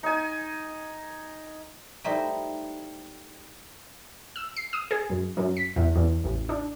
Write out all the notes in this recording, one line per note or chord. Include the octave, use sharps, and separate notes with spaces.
D#4 G#5
G3 A3 D#4 E4 C5
E6
C7
D#6
G#4
F#2
F#2
B6
E2
E2
A1
D4